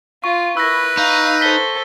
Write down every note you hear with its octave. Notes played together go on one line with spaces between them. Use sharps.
F4 C#6
E4 A#4 B4 E6 A#6
D#4 F5
A4 C5 B6 G7